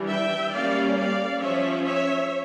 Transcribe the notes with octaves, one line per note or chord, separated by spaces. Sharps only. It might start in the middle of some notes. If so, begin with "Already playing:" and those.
Already playing: E3 G3 D4
E5 G5
G3 A#3 C#4 D5 F5
D5 F5
F3 C#4 C#5 E5
C#5 E5